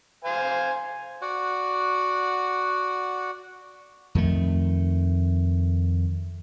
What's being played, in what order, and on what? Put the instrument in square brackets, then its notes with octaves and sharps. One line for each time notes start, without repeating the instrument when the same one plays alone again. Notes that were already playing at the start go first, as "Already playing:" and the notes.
[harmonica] C5 F5 G#5
[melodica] F#4 D5 F#5
[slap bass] F2 D#3 A3